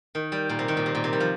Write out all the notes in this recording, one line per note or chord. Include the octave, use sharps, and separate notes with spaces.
D#3
G3
A#2
C3
D#3
A#2
C3
A#2
C3
G3
F3